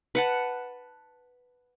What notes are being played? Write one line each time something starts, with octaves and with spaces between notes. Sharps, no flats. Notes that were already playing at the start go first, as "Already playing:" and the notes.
B4 F#5 A5